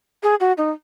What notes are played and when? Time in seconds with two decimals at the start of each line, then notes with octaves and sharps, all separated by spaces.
0.23 G#4
0.40 F#4
0.58 D#4